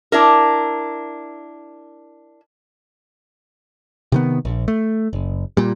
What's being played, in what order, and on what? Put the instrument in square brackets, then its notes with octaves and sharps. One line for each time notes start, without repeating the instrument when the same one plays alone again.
[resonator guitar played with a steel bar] D4 E4 A#4
[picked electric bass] C3 D#3 B3
A#1
A3
F#1
A#2 G3